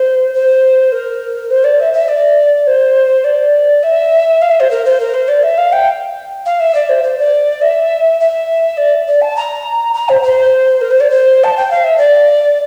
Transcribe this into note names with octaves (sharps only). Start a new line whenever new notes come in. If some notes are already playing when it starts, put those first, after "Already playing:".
Already playing: C5
C5
A#4
C5
D5
E5
E5
D5
C5
D5
E5
F5
E5
C5
A#4
C5
A#4
C5
D5
E5
F5
G5
F5
E5
D5
C5
C5
D5
E5
E5
D5
D5
A5
A#5
A#5
C5
C5
A#4
C5
D5
C5
A5
G5
F5
E5
D5